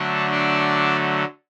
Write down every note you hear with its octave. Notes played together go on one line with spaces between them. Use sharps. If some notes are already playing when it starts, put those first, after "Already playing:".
Already playing: D3 F#3 A3 D4
D4 D5